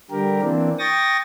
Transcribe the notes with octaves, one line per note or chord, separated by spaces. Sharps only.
D3 G3 G4 A#4
E3 A#3 C4 D4
G5 C#6 D#6 A6 A#6